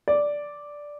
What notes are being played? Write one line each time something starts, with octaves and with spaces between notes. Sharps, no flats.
D5